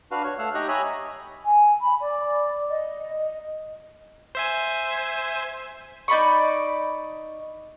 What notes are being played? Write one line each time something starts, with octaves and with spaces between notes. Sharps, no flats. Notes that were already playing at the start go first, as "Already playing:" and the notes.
D4 F#4 B4 F5
C#5
A3 F5 F#5 E6
D#4 G4 D#5 A#5 C#6 F#6
C#5 D#5 E5 G#5 A#5 B5
G#5
B5
D5
D#5
D#5
C5 E5 G#5
D#4 D5 B5 C#6